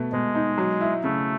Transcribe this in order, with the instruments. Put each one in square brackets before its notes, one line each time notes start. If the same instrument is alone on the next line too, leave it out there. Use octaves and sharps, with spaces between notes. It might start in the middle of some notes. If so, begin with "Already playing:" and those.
Already playing: [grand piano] B2 A3
[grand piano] B2 [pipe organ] G#3
[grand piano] D#4
F#3
E4
[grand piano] C#3 [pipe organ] A3